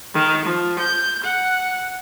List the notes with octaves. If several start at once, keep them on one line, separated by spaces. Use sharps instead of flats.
D#3
F3
G6
F#5